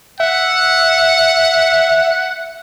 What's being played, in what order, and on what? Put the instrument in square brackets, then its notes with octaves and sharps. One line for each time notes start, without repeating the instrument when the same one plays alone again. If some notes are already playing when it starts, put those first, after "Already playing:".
[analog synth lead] E5 [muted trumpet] F#5